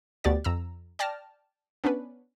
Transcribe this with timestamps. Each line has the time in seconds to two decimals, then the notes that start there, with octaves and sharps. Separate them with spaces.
0.24 D2 B2 G4 D5 A6
0.44 F2 A#5 E6
0.99 D5 G5 A5 F6 A#6
1.84 B3 C#4 D4 B4